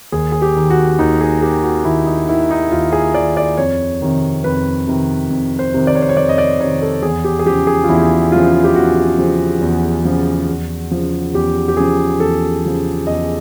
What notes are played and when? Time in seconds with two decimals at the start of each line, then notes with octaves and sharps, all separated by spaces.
0.12 D#2 G#4
0.32 G#4
0.42 G4
0.56 D#3
0.70 F#4
0.99 D#2 D#4
1.21 G#4
1.41 D#3 G4
1.63 F#4
1.85 D#2 E4
2.06 D#4
2.28 D#3 E4
2.51 D#4
2.72 D#2 F4
2.92 G#4
3.14 D#3 D5
3.37 D5
3.57 F2 C#5
4.02 C3 D#3
4.44 F2 B4
4.88 C3 D#3
5.30 F2
5.59 C5
5.74 C3 D#3
5.87 D5
5.95 C#5
6.02 C5
6.09 C#5
6.17 F2 D5
6.29 D#5
6.38 D5
6.60 C3 D#3 C#5
6.82 A4
7.02 E2 G#4
7.24 G4
7.39 G#4
7.45 C#3 F3 G4
7.67 G#4
7.84 F4
7.89 E2 E4
8.32 C#3 F3 F4
8.64 G4
8.75 E2 F#4
9.18 C#3 F3
9.61 E2
10.05 C#3 F3
10.48 E2
10.91 C#3 F3
11.34 E2 G4
11.68 G4
11.77 C#3 F3 G#4
12.20 E2 A4
12.64 C#3 F3
13.07 E2 D#5